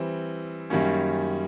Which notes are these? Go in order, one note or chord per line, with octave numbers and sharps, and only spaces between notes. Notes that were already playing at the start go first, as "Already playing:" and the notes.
Already playing: E3 G3 C4
F#2 D#3 G3 A#3 C#4